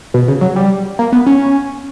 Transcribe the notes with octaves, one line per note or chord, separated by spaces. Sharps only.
B2
C#3
F#3
G3
A#3
B3
C#4